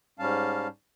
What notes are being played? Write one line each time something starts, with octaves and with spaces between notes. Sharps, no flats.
G#2 G3 C#4 F5 A5